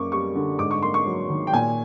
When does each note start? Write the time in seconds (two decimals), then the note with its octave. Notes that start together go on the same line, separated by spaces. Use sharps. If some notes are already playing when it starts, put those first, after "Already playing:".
Already playing: F#2 A#3 C#6 D6
0.12 G3 C#6
0.35 D3
0.59 G#2 D6
0.71 C#6
0.83 A#3 C6
0.94 C#6
1.06 F#3
1.30 D#3
1.47 G5
1.53 A#2 G#5